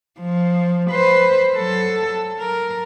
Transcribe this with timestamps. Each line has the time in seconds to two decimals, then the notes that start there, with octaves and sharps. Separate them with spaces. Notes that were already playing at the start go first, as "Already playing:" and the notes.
0.20 F3
0.91 B4 C5
1.56 F#3 A4
2.40 A#4